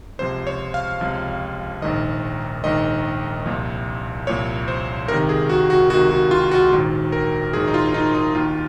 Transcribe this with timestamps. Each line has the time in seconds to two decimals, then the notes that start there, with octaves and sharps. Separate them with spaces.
0.19 C#2 C3 F3 C5
0.47 C#5
0.74 F5
1.01 C#2 C3 F3
1.82 A#1 G#2 D#3 D#5
2.64 A#1 G#2 D#3 D#5
3.46 C2 A#2 F3
4.27 C2 A#2 F3 C#5
4.68 C5
5.08 C#2 C3 D#3 A#4
5.29 G#4
5.49 F#4
5.70 F#4
5.90 C#2 C3 D#3 F#4
6.11 F#4
6.31 F4
6.51 F#4
6.72 A#1 G#2 D#3
7.12 A#4
7.53 A#1 G#2 D#3 G#4
7.68 D#4
7.74 F4
7.94 D#4
8.15 D#4
8.35 D#2 D#3 F4